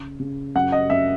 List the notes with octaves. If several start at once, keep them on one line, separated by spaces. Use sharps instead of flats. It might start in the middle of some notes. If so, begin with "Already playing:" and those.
Already playing: C#3
C#3
F#2 F#5
D#5
F#2 E5